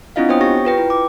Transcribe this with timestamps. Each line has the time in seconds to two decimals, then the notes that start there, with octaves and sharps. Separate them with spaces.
0.16 C4 D4 E4 F4 D#5 F5
0.29 B3 C5 C#5 G5 D#6
0.41 G4 C#6 A#6
0.65 F4 B4 G5
0.78 E4
0.90 D6